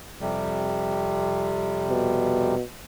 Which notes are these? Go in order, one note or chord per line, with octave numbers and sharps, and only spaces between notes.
F2 C3 G3
B2